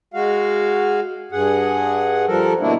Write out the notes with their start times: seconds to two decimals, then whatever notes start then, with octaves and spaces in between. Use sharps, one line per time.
0.14 G#3 F#4 F5
1.32 G2 G#4 F#5
2.27 F3 G3 A4 A#4
2.60 B2 D3 A3 A#3 D4 E4